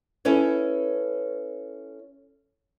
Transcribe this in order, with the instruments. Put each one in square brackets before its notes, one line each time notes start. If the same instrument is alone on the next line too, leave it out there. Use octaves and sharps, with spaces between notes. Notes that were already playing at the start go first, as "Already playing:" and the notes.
[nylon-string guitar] C#4 E4 A4 B4 C#5